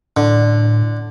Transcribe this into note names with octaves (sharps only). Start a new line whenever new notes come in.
A2 D3